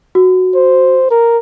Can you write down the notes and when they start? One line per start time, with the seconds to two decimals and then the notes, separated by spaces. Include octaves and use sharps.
0.15 F#4
0.55 C5
1.11 A#4